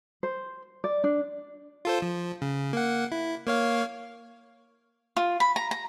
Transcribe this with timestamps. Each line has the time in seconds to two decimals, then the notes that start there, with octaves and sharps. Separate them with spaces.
0.23 C5
0.84 D5
1.04 D4
1.85 F4 A4 C5
2.02 F3
2.42 C#3
2.73 A#3 F#5
3.12 E4
3.47 A#3 C#5 F5
5.17 F4
5.40 B5
5.56 A#5
5.71 A#5